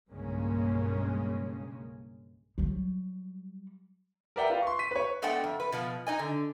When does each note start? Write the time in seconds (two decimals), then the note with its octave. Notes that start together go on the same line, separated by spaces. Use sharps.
0.12 B1 G2 C#3 G#3 A#3 C#4
2.58 F#3 G3
4.36 A#4 B4 D5 E5 F#5 G5
4.50 F4 B4 F5
4.62 C6 C#6
4.79 B6 D#7
4.91 B4 C#5
5.22 G#3 A3 B3 D4 F#5 G5
5.44 F2
5.60 B4
5.72 B2 F3 B3
6.07 D#4 D#5 G#5
6.19 D3